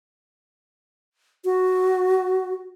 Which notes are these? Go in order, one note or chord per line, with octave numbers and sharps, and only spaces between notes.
F#4